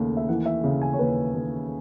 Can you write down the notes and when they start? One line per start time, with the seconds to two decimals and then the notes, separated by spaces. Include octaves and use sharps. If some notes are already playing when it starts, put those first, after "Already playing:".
Already playing: D#2 C#3 A3
0.17 E5
0.29 E3 F#5
0.46 E5
0.64 C#3
0.82 G#5
0.93 C#5
0.99 D#2 B4
1.34 D#2